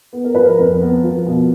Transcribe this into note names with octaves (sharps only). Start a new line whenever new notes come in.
B3
A#4
F3 B4
A#4
F2
B3
F3
B2